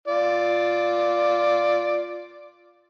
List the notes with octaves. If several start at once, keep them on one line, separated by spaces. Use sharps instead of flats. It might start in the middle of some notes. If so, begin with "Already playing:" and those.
F4 D5